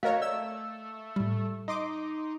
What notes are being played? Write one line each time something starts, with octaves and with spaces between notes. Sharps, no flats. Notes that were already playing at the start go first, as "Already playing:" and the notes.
A3 F#4 A#4 C#5 D#5 F5
D5 E6
A2 G3
D#4 D#5 C6 D6